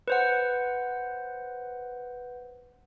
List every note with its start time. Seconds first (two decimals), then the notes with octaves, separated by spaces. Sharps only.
0.08 B4 C5 F#5